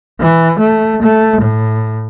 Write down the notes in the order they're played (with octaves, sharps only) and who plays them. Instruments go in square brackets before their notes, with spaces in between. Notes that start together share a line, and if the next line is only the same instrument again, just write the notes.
[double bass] E3
A3
A3
A2